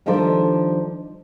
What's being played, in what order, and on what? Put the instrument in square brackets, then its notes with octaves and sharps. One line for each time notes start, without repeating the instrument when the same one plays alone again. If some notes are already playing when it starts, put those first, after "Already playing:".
[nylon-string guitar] D#3 F3 G3 D4 A4 C5